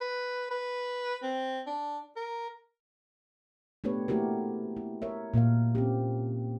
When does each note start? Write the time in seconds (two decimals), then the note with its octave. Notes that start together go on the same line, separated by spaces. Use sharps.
0.01 B4
0.51 B4
1.23 C4
1.66 D4
2.16 A#4
3.84 A3 B3 D4 G4 B4 C#5
4.08 A3 A#3 E4 F#4 G4 A#4
4.77 E4
5.02 A#4 C#5 E5
5.34 A#2 A#3 A#4 F5
5.75 C4 C#4 G4